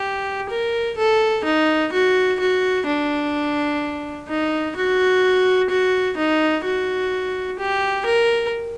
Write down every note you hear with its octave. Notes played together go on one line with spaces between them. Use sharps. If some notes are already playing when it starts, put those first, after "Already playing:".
Already playing: G4
A#4
A4
D#4
F#4
F#4
D4
D#4
F#4
F#4
D#4
F#4
G4
A#4